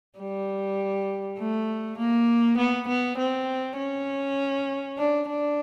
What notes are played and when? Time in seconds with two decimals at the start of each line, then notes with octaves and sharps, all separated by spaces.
0.19 G3
1.39 A3
1.98 A#3
2.58 B3
2.88 B3
3.18 C4
3.78 C#4
4.98 D4
5.28 D4